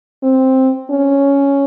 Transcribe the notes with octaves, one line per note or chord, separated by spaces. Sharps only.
C4
C#4